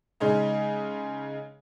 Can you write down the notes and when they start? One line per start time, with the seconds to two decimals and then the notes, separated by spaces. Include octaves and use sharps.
0.20 C#3 G#3 C#4 D#4